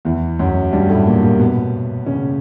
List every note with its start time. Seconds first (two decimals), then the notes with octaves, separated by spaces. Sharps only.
0.05 E2 E3
0.39 F#2 F#3
0.72 G2 G3
0.89 A2 A3
1.06 A#2 A#3
1.22 A#2 A#3
1.39 B2 B3
2.06 C#3 C#4